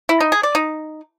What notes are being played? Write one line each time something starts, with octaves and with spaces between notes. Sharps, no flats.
E4
D#4
G#4
D5
D#4